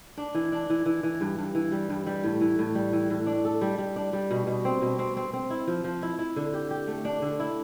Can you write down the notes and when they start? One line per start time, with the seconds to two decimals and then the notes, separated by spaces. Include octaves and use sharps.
0.17 D4
0.35 E3
0.52 D4
0.70 E3
0.86 E3
1.03 E3
1.21 G2
1.38 G2
1.55 E3
1.72 G3
1.89 G2
2.07 G3
2.24 A2
2.41 E3
2.59 A2
2.75 G3
2.92 E3
3.10 A2
3.26 D4
3.45 A4
3.61 G3
3.78 G3
3.96 D4
4.13 G3
4.31 B2
4.47 B2
4.65 C4
4.82 B2
4.99 C4
5.17 C4
5.33 C4
5.50 E4
5.67 F3
5.84 F3
6.02 E4
6.19 E4
6.36 D3
6.54 G4
6.71 G4
6.87 A3
7.05 D4
7.22 D3
7.40 E4